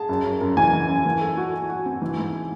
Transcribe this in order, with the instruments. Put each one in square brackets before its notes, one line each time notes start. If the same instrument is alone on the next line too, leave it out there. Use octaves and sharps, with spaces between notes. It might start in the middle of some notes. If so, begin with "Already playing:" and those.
Already playing: [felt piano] G#4 [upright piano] A5
[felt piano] F#2
F#2
F#2
[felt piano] E3 [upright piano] G#5
[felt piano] E3
F#2
E3
A4
F#4
F#4
F#4
C4
E3
G#2